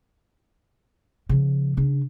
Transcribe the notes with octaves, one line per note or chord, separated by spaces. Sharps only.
C#3 F3
C#3 D4